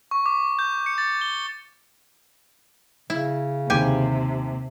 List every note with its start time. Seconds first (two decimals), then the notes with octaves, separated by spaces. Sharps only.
0.11 C#6
0.26 D6
0.59 G6
0.86 C#7
0.98 A6
1.21 G7
3.10 C#3 E4
3.70 D#2 C3 G4 G#5